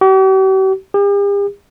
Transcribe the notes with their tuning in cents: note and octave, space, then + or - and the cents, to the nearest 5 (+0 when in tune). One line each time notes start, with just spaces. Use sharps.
G4 -45
G4 +45